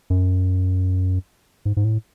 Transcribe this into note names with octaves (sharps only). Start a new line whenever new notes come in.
F#2
G#2
G#2
A2